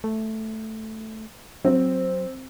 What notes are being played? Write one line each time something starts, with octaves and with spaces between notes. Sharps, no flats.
A3
F#3 C4